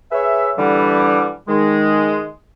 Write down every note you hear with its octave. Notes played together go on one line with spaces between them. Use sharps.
G#4 B4 C#5 E5
D3 E3 G3
D#3 G#3